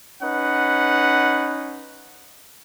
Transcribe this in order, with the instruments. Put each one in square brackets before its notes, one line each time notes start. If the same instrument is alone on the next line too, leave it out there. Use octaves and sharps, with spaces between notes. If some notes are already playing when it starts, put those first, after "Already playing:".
[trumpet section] C#4 D#4 B4 F#5